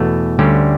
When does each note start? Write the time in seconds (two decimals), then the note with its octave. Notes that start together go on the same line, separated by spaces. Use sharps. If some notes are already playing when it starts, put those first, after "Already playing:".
Already playing: E2 B2 A3
0.39 D2 D3 G3 C#4 G4